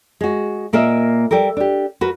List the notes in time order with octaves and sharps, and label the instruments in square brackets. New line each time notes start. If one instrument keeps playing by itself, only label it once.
[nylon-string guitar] G#3 F#4
A#2 A#3 A#4 D#5 E5
G3 G4 A4 A#4
D4 G4
F#4 A#4 B4